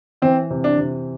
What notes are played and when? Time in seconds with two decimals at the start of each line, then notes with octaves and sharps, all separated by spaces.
0.22 E3 C4
0.50 C3
0.64 D4
0.78 C3